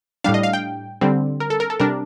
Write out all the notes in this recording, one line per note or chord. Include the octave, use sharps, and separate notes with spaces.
A2 G3 D4 F5
D#5
F5
G5
D3 G3 C4
A#4
A4
A#4
A4
C3 G3 D4 A#4